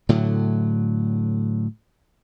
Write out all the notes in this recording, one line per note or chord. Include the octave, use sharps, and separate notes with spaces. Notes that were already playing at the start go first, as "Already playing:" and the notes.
A2 D3 F#3